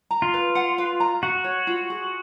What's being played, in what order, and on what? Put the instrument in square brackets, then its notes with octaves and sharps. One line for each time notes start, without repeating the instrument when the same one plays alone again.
[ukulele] A#5
[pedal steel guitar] F4
[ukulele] B4
F#5
B4
A#5
[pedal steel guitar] F#4 [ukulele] F#5
[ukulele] C#5
F4
G#4